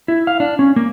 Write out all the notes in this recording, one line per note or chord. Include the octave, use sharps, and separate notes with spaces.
E4
F5
D4
C#4
A#3